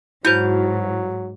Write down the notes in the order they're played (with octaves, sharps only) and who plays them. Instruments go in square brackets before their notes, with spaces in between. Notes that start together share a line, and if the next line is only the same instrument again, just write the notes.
[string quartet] G#2 [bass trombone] F#3 [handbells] E4 F#4 C5 [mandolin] G6